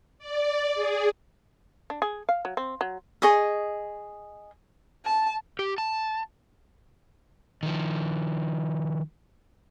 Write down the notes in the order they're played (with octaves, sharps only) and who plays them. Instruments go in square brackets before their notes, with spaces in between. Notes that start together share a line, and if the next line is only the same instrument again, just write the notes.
[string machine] D5
G#4
[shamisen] D4
G#4
F5
F#3
C4
F#3
[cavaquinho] G#4 D#5 C#6 D#6
[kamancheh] A5
[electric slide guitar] G4
A5
[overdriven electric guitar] D#3 F3